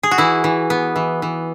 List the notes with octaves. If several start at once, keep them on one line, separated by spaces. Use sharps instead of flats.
G#4
F#4
E3 E4
E3
B3
E3
E3